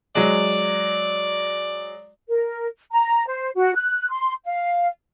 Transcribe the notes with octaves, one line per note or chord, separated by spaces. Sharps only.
F#3 G#3 D5
A#4
A#5
C5
F#4
F#6
C6
F5